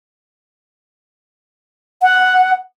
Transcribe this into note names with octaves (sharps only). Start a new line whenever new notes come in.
F#5